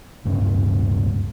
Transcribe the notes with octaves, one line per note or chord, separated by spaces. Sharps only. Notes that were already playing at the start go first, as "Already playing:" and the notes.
D1 G2 C#4